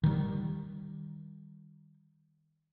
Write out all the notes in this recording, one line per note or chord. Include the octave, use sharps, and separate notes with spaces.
D#3 G3